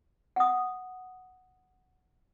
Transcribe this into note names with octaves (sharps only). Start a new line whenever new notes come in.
F#5 D#6